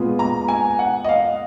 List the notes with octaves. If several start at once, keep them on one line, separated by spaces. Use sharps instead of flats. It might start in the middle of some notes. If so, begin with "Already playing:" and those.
Already playing: A#2 G#3 B3 F4
A#5
G#5
F#5
D#5
F5